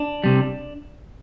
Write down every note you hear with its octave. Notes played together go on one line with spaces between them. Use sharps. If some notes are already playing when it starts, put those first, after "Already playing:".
Already playing: D4
C3 G3